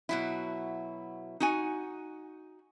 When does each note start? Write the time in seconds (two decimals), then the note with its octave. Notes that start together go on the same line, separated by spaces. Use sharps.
0.09 B2 F#3 E4
1.40 D#4 F#4 G#5